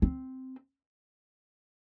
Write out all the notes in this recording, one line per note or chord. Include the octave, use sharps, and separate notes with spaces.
C4